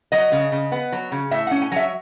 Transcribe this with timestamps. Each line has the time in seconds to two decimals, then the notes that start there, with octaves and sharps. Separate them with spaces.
0.12 F#3 D#5
0.32 C#3
0.52 C#3
0.72 B3
0.92 F#3
1.12 C#3
1.31 A2 E5
1.47 C#4 F#5
1.62 G#5
1.71 F#3 E5